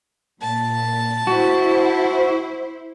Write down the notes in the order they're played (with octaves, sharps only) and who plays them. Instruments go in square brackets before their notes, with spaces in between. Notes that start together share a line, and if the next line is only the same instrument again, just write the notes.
[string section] A#2 [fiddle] A5
[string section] E4 C5 [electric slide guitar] F#4